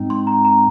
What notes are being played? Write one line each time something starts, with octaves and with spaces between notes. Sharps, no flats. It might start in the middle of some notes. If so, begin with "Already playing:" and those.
Already playing: G#2 G#3 C4 D#4
C6
A#5
A#5